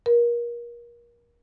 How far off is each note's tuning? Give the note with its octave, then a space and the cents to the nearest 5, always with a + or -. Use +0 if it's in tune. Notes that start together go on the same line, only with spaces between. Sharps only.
A#4 +30